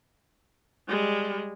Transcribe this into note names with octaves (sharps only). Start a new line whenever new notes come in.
G3 G#3